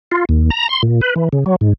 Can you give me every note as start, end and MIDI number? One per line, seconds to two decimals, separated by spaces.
0.11 0.25 65
0.29 0.50 39
0.50 0.68 82
0.69 0.82 84
0.83 1.01 46
1.01 1.14 71
1.16 1.29 52
1.33 1.44 49
1.46 1.56 54
1.61 1.73 44